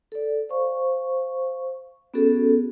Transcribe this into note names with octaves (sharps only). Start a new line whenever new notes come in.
A4 D5
C5 F5 C#6
B3 C#4 F#4 G#4 A4